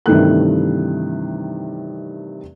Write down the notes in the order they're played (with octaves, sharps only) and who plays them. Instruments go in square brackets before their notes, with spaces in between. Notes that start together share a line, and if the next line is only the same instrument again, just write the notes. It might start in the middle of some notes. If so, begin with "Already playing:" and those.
[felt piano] G2 C3 D#3 E3 A3 F#6